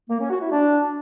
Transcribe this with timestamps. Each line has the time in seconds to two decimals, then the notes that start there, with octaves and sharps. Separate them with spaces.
0.09 A#3
0.19 C#4
0.30 F#4
0.40 E4
0.51 D4